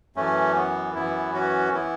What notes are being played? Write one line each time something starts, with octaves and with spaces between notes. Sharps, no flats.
F#2 E3 A3 C#4
B3
F#2 E3 B3 E4
C#4 F#4
E3 B3 E4